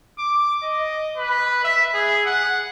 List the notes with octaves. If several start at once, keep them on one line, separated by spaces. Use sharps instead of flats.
D6
D#5
B4
E5
G#4
F#5